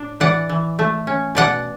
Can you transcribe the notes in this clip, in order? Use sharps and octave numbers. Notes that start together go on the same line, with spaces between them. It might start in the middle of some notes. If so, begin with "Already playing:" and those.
Already playing: A2 D4
E3 D5 F#5
E3
A3
C#4
B2 D5 F#5